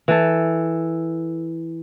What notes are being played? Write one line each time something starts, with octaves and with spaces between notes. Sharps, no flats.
E3 A4